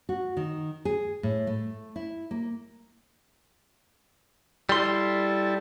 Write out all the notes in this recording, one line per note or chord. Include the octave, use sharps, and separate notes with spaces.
F#4
D#3
G#4
A2
A3
E4
A#3
G3 E4 A4 C6